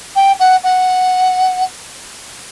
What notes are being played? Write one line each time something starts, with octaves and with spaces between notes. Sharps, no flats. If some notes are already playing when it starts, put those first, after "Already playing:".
G5
F#5
F#5